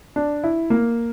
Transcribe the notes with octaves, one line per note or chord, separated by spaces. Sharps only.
D4
E4
A#3